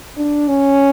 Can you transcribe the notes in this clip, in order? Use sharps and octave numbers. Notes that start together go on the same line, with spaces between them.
D4
C#4